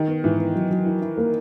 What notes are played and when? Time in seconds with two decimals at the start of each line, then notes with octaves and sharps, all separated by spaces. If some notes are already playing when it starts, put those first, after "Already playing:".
Already playing: D#3
0.08 B3
0.24 G#2 E3
0.39 B3
0.55 F#3
0.71 F#3
0.86 E4
1.02 E4
1.18 A#3